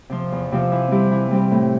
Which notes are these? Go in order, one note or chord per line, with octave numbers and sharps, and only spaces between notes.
C3 F3 C4 F4
E2
C3 F3 C4 F4
E3
G3 C4 E4 G4
E3
G3 C4 E4 G4
A2